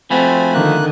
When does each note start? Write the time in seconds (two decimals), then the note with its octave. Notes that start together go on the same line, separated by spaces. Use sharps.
0.11 F3 A3 C4 F#4 G#5 B5
0.54 D3 D#3 A#3 F#6